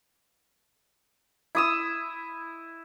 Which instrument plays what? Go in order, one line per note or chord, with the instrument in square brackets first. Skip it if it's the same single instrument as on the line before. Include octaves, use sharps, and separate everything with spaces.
[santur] E4 D#6 E6